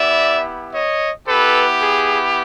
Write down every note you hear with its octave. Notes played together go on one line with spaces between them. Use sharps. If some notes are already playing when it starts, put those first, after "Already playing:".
Already playing: B3 E4 G4 D5 E5
C#5 D#5
B3 E4 G4 A4 B4
G#4